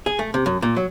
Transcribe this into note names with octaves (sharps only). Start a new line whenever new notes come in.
G#4
A3
C3
F#2
A#2
F#3